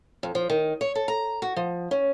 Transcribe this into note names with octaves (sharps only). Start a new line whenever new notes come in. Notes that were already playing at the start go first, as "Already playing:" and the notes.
F2
F3
D#3
C#5
A4
A#5
F#4
F3
C#4